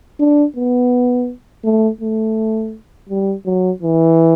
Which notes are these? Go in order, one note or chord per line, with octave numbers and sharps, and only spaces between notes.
D4
B3
A3
A3
G3
F#3
E3